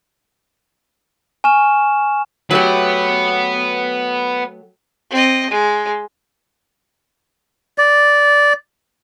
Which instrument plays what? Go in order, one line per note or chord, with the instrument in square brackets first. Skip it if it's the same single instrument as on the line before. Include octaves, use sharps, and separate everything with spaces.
[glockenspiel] G#5 C#6 F6 E7
[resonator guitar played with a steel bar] F#3 A3 G4 [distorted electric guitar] B4 F#5
[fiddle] C4 D#5
G#3
[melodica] D5